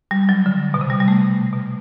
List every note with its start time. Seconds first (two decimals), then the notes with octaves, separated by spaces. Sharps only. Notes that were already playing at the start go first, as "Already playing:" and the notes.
0.11 G3
0.29 F#3
0.46 D3
0.74 B2
0.81 C3
0.90 G3
1.00 G3
1.08 A3
1.18 C3
1.53 B2